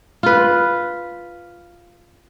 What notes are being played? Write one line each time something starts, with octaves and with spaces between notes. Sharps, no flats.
F4 B4